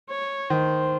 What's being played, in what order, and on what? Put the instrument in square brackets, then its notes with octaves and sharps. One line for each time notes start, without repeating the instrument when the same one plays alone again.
[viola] C#5
[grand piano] D#3 [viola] C5